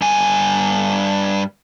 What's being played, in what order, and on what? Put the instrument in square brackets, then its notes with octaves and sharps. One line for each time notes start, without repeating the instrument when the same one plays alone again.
[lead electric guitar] G2 G#5